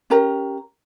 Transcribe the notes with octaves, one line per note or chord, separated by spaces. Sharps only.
C#4 G4 A#4 A#5